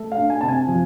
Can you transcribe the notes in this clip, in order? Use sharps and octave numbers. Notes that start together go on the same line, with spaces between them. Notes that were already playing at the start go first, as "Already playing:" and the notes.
Already playing: A3
F5
D4
G#5
C3 A5
G#5
F3